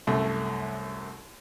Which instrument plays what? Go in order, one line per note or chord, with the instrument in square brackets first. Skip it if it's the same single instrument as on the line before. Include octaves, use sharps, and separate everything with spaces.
[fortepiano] C2 F#2 A3